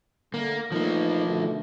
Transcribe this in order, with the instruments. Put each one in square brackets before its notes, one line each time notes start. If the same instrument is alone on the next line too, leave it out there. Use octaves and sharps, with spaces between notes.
[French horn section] D3 A3 [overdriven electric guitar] A#3
[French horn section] E3 A3 D#4 [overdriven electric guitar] F3 A#3
[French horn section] B2 D3 A3